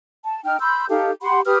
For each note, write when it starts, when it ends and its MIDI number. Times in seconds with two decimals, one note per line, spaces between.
0.25 0.43 81
0.45 0.58 63
0.45 0.58 79
0.45 0.58 89
0.60 0.85 83
0.60 0.85 84
0.60 0.85 88
0.60 0.85 91
0.90 1.10 63
0.90 1.10 67
0.90 1.10 69
0.90 1.10 77
1.22 1.41 67
1.22 1.41 78
1.22 1.41 83
1.22 1.41 84
1.46 1.58 67
1.46 1.58 71
1.46 1.58 87
1.46 1.58 89